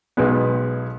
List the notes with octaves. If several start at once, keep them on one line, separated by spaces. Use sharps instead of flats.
B1 B2 G#3 B3